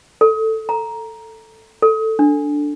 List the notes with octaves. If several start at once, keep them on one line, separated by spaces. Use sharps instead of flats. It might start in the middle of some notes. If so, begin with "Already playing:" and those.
A4
A#5
A4
D4